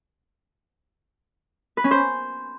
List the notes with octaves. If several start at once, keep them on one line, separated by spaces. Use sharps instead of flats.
B4
C#4
C5